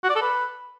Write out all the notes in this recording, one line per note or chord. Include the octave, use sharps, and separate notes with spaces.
F#4
D5
A4
B4